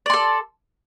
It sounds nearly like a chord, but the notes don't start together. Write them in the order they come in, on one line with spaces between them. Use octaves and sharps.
D5 C6 A4